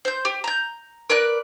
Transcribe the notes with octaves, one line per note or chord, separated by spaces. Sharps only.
C5 G6
G4
A#5 G6
A#4 B4 D5 F#6